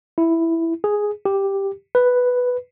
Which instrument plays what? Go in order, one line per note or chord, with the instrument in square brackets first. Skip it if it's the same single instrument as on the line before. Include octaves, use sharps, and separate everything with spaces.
[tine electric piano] E4
G#4
G4
B4